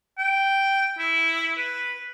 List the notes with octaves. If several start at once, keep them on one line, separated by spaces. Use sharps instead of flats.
G5
E4
B4